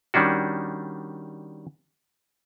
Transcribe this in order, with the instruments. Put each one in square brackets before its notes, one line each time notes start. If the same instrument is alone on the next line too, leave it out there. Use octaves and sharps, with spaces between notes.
[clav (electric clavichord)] D#3 G3 C#4 D4 F#4